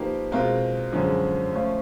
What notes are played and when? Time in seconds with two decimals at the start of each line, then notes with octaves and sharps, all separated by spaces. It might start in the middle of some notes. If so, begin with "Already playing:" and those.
Already playing: F3 A#3 D#4 G4 B4
0.32 B2 G#3 C4 F4 A#4
0.92 F#2 D3 F3 G#3 C#4
1.52 F3 A3 C#4 F4